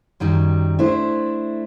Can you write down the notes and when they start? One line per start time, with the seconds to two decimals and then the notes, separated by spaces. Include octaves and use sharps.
0.20 F#2 D#3 F#3 G3
0.79 A3 D4 E4 C5